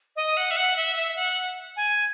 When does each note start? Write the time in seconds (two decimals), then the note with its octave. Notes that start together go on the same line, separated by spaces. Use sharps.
0.16 D#5
0.37 F#5
0.51 E5
0.57 F#5
0.76 E5
0.96 E5
1.16 F#5
1.76 G#5